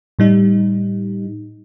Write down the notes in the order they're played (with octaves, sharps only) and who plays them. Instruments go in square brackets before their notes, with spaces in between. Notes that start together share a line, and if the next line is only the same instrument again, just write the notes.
[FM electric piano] A2 G3 D#4